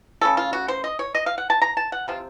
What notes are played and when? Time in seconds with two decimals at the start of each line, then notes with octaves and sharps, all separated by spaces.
0.21 C#3 A3 C#4 A4
0.37 F4
0.53 F#4
0.68 C5
0.84 D#5
0.99 C#5
1.15 D#5
1.26 F5
1.38 F#5
1.50 A5
1.62 A#5
1.77 A5
1.92 F#5
2.08 C3 F3 C4 F4